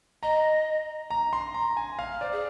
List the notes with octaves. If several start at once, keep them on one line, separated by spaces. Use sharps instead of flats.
D#5 A#5
A#5
C6
A#5
G#5
F5
C5 D5
G#4